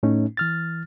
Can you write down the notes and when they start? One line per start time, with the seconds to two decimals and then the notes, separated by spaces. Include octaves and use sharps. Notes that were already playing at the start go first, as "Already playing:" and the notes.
0.03 A2 A3 C#4 D#4
0.37 E3 F6 A6